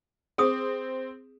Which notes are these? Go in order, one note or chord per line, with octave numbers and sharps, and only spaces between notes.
C4 G#4 D#6